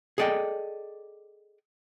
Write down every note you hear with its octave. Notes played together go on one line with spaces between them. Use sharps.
G#4 A4 D5 D#5 G5